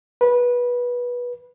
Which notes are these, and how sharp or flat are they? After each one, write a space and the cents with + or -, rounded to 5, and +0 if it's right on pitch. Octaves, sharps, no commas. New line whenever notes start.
B4 -20